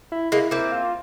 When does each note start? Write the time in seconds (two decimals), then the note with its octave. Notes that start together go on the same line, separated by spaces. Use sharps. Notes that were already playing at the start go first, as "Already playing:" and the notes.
0.12 E4
0.32 G#3 A#3 E4
0.51 A#3 C4 E4
0.72 F4